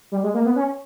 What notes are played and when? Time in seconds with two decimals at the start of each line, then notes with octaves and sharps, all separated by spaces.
0.12 G3
0.23 G#3
0.34 A#3
0.45 B3
0.56 C#4